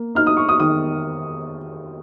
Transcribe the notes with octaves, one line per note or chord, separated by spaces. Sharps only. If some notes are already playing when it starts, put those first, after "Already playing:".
Already playing: A#3
D#4 F6
D#6
C#6
D#6
D#3 D#6